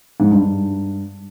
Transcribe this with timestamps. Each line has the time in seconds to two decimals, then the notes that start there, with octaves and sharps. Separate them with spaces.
0.20 G#2
0.31 G2
0.42 G2